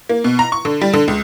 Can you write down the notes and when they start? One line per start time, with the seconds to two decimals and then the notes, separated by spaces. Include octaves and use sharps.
0.09 A#3
0.24 B2
0.39 A#5
0.52 C#6
0.65 D3
0.81 G3
0.94 D3
1.08 C#2